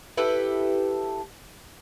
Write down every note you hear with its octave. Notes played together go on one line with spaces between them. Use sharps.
E4 G4 A4 B4